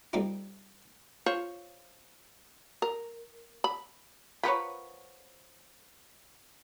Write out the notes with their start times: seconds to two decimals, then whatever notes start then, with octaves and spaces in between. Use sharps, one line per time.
0.13 G3 A3 A#3 C4 D#4 F4
1.26 F4 C5 C#5
2.82 A#4
3.64 B5
4.43 F3 A#4 B4 C#5 F#5 B5